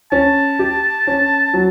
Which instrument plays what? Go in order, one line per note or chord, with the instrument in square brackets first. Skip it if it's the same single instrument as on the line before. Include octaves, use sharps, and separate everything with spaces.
[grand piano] C#4 [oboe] A5
[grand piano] G4
C#4
F#3